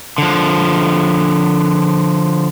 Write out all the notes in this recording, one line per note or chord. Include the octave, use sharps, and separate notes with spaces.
D3 F3